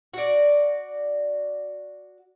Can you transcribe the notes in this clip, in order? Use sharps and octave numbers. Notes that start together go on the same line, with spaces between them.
F#4 D5